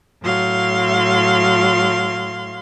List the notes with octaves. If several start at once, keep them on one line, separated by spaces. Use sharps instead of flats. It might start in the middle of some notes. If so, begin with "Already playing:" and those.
A2 F#3 F5 C6